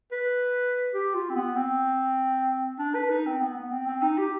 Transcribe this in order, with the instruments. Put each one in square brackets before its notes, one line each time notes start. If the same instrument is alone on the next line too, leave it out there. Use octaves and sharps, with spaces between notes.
[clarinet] B4
G4
F4
C4
B3
C4
D4
B4
D#4
C4
B3
B3
C4
C4
D#4
G4